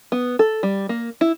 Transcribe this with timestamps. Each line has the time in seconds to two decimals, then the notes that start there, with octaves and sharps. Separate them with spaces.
0.12 B3
0.39 A4
0.63 G3
0.89 A#3
1.21 E4